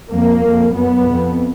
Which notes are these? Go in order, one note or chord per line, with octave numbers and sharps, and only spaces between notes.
F2 A#3
F2
F#2 B3
F2